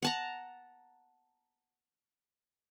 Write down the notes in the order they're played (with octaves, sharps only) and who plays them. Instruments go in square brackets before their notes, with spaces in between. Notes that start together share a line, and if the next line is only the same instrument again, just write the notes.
[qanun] F#5 A5 A#5